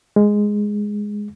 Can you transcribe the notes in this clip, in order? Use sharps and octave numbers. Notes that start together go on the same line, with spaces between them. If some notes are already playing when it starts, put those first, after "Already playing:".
G#3